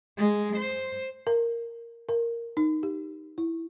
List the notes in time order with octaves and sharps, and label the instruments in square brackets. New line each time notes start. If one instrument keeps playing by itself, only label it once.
[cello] G#3
C5
[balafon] A#4
A#4
D#4
G4
E4